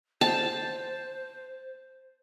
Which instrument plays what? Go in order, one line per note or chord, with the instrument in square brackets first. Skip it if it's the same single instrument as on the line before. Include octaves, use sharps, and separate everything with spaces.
[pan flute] C5 [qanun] A5